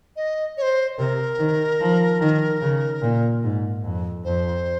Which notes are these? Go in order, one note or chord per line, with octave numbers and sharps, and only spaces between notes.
D#5
C#5
C5
C3 A#4
D#3
F3
D#3
C#3
A#2
G#2
F2
F2 C5